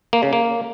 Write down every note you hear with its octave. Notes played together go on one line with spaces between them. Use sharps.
A#3
C#3
A#3